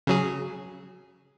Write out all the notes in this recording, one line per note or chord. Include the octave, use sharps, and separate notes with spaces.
C#3 F#3 G#4